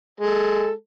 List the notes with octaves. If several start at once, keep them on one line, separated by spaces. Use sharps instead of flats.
G#3 A4